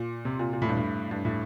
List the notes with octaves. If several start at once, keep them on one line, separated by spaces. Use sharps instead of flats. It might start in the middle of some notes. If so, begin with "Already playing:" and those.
Already playing: A#2
C3
A#2
A#2
A2
G2
A2
G2
A2